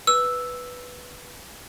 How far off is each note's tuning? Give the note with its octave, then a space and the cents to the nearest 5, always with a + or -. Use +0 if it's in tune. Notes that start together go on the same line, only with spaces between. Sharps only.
B4 +0 E6 +0